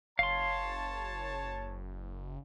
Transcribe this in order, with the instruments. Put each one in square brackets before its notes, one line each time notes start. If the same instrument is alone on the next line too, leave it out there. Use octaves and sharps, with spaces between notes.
[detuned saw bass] F#1 [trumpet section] C#5 A5 [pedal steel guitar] F5 C6